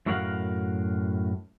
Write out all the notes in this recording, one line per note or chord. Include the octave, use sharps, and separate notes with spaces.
F#2 A2 F#4 A#4 F5 F#5